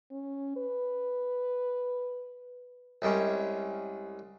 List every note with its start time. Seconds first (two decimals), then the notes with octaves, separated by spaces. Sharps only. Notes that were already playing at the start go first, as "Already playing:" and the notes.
0.11 C#4
0.56 B4
3.02 C2 G3 G#3 C#4